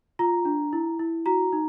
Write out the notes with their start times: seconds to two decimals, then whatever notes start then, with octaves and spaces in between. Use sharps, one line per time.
0.19 F4 A#5
0.45 D4
0.73 E4
0.99 E4
1.26 F#4 A#5
1.53 D#4